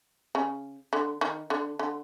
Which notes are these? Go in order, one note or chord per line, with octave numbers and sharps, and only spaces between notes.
C#3
D3
D#3
D3
D3